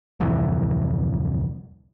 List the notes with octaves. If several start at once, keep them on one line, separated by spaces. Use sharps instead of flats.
D1 C2 F2 E3